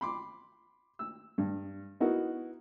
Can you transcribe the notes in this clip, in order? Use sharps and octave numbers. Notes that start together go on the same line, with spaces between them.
B5 C6 D6
E6
G2
B3 D#4 E4 F#4 A#4